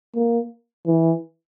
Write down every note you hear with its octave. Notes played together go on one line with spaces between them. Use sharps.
A#3
E3